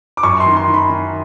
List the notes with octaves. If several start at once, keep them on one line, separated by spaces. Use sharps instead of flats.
D6
F#2 C#6
C6
D#3
C6
D#3
B5
D#3